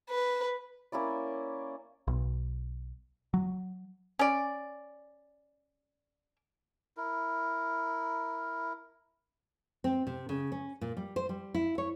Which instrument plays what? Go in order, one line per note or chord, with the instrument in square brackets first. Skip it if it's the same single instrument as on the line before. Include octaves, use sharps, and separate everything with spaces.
[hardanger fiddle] B4
[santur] A#3 C#4 E4 D5
[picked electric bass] B1
F#3
[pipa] C#4 D5
[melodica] E4 A#4
[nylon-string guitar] C4
C3
C#3
C#4
A#2
G3
C5
G3
E4
C#5